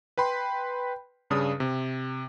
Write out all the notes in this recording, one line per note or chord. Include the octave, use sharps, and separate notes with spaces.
B4 G5 B5 C6
G2 C#3 D4 D#6
C3